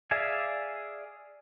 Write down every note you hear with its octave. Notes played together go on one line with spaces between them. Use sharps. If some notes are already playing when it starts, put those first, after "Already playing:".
G#4 D5 E5 F5 G#5